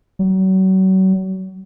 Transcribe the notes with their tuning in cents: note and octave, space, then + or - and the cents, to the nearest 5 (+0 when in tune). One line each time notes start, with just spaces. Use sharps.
F#3 +35